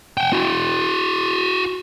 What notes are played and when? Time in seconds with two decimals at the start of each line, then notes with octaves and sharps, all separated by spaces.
0.17 F#5 G5
0.32 E4 F#4